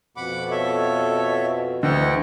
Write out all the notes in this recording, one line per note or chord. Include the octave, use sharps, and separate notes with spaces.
F2 B2 F#5 B5 D6
A4 C#5 E5
D2 D3 E3 D#5 F#5 G5